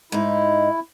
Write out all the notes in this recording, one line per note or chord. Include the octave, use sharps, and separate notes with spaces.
G#2 D#4 E4